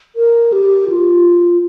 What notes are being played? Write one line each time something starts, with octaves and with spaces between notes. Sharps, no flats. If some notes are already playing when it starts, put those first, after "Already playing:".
A#4
G4
F4